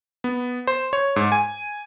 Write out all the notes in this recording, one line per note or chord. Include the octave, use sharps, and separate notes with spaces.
B3
C5
C#5
G#2
G#5